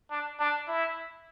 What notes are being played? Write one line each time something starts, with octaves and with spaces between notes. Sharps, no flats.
D4
D4
E4